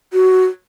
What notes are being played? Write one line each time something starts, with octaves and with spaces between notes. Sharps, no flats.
F#4